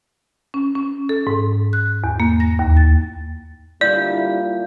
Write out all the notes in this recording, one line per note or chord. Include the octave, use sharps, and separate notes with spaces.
C#4
C#4
A4
G#2
F#6
E2
A#3
A#6
D#2
A6
A#2 D3 G3 E4 D5 G6